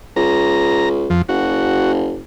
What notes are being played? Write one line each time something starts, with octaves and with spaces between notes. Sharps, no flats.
C#2 A#5
F2 F3
F#1 F#4